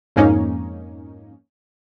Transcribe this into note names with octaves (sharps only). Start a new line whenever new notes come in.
F2 G#2 A#3 C#4 D#4